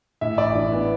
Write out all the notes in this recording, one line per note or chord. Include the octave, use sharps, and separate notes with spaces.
A2 E5
A1 D5
E3
B3